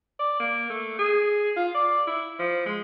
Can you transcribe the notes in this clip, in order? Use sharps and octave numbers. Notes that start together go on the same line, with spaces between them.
D5
A#3
A3
G#4
F4
D5
E4
F3
G#3